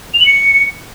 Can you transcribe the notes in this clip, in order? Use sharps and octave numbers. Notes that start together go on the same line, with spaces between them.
F7
F#7
C#7